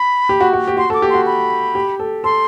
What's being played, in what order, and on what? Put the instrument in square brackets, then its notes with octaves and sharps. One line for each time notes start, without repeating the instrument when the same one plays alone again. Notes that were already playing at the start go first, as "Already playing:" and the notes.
Already playing: [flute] B5
[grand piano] G4
F#4
F#4
G4
[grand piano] F#4 [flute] C6
[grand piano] A4 [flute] D6
[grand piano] G4
[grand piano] F#4 [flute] C6
[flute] B5
[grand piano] G4
A4
[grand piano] A4 [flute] C6